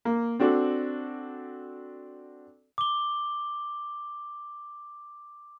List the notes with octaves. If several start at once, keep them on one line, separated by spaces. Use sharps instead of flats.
A#3
C4 D4 F#4 A4
D6 G7